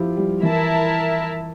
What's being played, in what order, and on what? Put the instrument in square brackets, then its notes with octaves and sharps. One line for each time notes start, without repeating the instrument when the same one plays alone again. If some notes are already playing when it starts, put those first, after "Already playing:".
Already playing: [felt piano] F3 E4 F4 G4
G3
[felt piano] E3 [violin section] E4 A#4 E5 A5